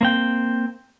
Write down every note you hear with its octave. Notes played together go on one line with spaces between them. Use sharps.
A#3 C4 G5